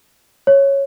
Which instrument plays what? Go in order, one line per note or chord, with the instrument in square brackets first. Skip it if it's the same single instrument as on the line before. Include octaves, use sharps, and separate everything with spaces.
[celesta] C#5